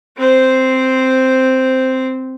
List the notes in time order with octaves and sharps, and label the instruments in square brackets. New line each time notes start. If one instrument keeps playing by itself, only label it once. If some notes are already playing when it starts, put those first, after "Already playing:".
[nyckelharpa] C4 C5